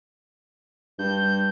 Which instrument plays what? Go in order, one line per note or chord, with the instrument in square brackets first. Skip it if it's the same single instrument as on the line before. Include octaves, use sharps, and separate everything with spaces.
[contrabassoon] G2 [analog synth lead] G6